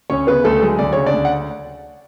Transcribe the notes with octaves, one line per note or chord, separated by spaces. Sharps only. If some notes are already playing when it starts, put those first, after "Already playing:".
D2 C#4 C#5
C#3 B3 B4
D2 A3 A4
F#3 G#3 G#4
D2 D5
C#3 C#5
D4 D5
D2
F#5